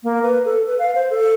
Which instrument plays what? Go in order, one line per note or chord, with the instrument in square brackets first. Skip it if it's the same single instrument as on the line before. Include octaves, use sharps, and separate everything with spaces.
[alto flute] A#3
B4
A4
B4
F5
C5
A4